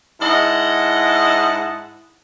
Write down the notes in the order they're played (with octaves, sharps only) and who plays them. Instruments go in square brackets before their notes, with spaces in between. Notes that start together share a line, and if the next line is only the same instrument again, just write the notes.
[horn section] G#2 E4 D#5 F#5 A5